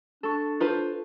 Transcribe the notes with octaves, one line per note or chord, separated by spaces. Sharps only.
D4 A4 C#6
F4 B4 C5